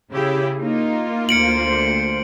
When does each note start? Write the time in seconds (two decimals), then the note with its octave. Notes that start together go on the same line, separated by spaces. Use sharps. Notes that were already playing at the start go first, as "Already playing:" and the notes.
0.12 C#3 E4 G4 G#4
0.61 A#3 D#4 F4
1.29 D2 C5 C#7 D7 F#7